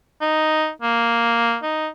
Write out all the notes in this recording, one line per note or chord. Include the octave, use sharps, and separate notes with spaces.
D#4
A#3
D#4